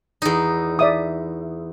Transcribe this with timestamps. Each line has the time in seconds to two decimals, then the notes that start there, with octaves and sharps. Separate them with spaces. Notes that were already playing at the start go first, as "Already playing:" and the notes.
0.22 E2 D#4
0.79 D5 E5 D#6